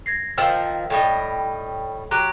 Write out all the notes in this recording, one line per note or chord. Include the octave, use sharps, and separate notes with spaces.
G#6 A#6 C7
D#3 F3 G5 E6 F6
A2 G3 D#5 G5
F#3 G4 A#5 F#6